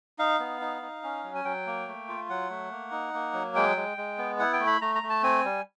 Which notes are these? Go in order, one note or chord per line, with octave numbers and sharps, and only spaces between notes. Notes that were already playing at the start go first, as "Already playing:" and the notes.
D#4 F5
B3
D#4
D#4
C#4
F#3
G#5
F#3 G5
A#3
A3
F4
F#3 F#5
A3
A#3
D#4
A#3
F#3
G#3 G5
G#3
G#3
B3
E4 F#5
G5
A3
B5
A3 A#5
A#5
A3
A5
C4 G#5
G3